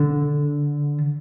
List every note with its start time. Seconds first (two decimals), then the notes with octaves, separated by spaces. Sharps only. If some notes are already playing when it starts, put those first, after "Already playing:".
Already playing: D3